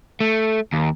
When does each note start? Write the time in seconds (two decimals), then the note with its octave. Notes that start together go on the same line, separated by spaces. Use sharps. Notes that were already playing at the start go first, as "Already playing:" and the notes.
0.20 A3
0.73 D#2